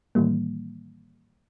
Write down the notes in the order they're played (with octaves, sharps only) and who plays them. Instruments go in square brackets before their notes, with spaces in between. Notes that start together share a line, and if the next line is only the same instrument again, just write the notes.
[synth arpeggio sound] A2 D#3 E3 G3 A#3